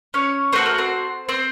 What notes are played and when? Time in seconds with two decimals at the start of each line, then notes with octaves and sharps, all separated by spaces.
0.14 C#4 C#5
0.52 A3 C4 F#4 A4 C5
0.66 A#4
0.78 C4 C5
1.29 C4 C5